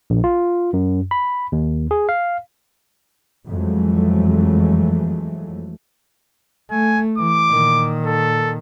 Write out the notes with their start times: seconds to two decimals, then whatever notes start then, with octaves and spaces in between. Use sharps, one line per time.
0.10 A#1
0.24 F4
0.73 F#2
1.11 B5
1.52 D#2
1.91 G#4
2.09 F5
3.48 F2 E3 F#3 G#3 A3
6.71 A3 G#5
7.18 E3 D6
7.50 A#2 D#3
8.06 A4